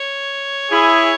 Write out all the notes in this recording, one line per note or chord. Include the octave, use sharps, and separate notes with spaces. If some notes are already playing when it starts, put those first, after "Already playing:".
Already playing: C#5
E4 G#4